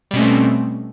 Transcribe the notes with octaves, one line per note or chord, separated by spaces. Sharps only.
B2 G3 A3 C4 C#4